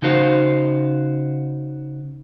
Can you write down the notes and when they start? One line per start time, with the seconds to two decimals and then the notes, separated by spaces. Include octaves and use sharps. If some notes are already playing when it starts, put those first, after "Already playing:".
0.02 C#3 D#4 F#4 C5 F5